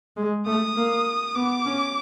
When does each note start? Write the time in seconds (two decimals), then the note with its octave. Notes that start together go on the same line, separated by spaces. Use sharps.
0.17 G#3
0.46 A3 D#6
0.76 A#3
1.35 B3 D6
1.65 C#4